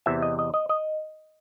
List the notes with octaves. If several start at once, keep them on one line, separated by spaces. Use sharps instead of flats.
E2 C3 E3 E5
D#5
D#5
D#5
D#5